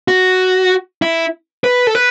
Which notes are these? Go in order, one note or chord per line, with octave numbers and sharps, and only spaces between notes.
F#4
E4
B4
A4
B4